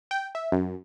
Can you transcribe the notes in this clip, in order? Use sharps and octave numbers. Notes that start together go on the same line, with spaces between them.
G5
E5
F#2